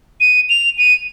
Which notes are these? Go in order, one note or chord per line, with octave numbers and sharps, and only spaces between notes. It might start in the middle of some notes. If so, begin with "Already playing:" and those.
D#7
F7
D#7